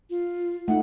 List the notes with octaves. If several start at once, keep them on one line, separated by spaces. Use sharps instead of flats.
F4
A3 D#4 F#5